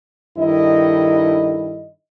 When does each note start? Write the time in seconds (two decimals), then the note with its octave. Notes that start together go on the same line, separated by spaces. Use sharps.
0.38 G2 D#3 D#4 E4 A4 D#5